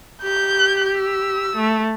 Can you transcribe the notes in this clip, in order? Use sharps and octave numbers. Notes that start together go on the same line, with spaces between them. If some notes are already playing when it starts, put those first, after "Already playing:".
G4 G6
E6
A3